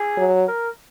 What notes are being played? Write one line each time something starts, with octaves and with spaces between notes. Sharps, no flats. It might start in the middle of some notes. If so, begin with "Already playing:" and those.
Already playing: G#4
F#3
A#4